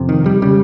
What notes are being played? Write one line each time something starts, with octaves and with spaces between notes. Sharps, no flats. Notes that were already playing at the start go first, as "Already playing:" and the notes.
Already playing: F2 C3
D#3
G3
C#3 G3